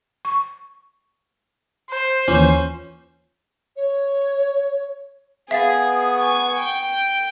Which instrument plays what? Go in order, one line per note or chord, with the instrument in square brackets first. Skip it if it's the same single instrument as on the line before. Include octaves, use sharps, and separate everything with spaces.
[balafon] C#6
[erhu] C5
[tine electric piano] D#2 E3 [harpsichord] C#4 [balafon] F4
[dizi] C#5
[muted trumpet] B3 [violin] G#4 [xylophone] E5 F5 A6
[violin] G#5 C#6
G5